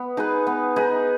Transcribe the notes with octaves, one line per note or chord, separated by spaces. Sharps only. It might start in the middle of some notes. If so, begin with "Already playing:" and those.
Already playing: B3
D#4 G#4 B4
B3
D#4 G#4 B4